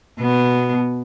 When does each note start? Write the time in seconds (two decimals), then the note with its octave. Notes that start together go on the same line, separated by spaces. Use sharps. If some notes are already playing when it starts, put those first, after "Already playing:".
0.19 B2 B3